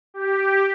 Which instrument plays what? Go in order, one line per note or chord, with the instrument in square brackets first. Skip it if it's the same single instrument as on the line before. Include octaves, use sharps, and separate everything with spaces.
[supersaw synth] G4